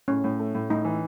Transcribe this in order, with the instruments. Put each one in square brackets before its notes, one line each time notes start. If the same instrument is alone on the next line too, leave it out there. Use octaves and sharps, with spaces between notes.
[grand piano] A2 [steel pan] C#4
[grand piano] A2
A3
A2
[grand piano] A2 [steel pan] D#4
[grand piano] E3